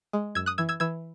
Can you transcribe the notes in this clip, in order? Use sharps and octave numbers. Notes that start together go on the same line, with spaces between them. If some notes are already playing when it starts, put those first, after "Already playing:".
G#3
F#2 E6 G#6
D#6 F#6
E3 E6 G#6
E6 G#6
E3 E6 G#6